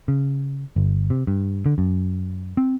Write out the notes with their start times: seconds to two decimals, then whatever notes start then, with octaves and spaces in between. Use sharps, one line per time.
0.08 C#3
0.76 G1
1.10 C3
1.27 G2
1.66 D3
1.78 F#2
2.57 C4